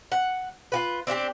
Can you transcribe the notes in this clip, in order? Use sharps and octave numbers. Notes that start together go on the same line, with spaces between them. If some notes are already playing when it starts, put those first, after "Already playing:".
F#5
F4 F#4 B4
C4 D4 E4 G4